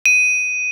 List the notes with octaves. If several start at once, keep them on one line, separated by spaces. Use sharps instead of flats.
D#7